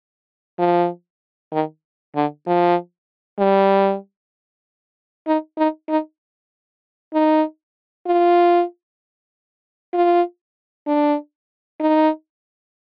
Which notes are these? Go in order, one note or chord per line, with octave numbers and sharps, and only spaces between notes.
F3
D#3
D3
F3
G3
D#4
D#4
D#4
D#4
F4
F4
D4
D#4